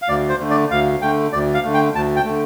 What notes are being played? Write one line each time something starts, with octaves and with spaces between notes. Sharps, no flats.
F5
D2 D5
C5
D3 A3
D5
D2 F5
D3 A3 G5
D2 D5
F5
D3 A3
G5
D2 A5
G5
D3 A3